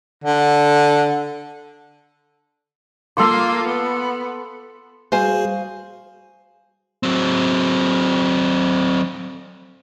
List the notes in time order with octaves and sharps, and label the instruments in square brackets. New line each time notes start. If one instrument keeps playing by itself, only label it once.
[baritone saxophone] D3
[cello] A#3 F4 [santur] A4 C6 D6
[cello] B3
[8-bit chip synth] G3 F#4 G#4 [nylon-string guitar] C5 F5 G#5
[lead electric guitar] F#3 C4